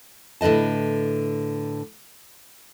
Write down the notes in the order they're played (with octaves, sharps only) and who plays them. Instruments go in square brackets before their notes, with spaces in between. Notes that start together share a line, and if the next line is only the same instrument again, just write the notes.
[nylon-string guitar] A2 D3 B4 D#5 A5